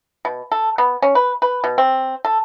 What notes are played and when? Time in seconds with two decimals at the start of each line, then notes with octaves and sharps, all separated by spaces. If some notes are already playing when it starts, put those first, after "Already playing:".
0.25 B2
0.52 A4
0.78 B3
1.02 C#4
1.15 B4
1.42 B4
1.64 B2
1.78 C4
2.25 A4